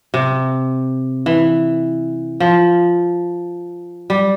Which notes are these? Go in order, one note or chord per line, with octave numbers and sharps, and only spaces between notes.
C3
E3
F3
G3